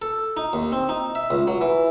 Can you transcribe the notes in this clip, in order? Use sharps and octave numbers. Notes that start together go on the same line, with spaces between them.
A4
D#4
D#2
C4
D#4
E5
C#2
F#3
E3